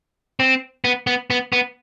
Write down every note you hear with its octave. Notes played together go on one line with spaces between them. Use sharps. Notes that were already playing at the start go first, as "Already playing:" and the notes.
C4
B3
B3
B3
B3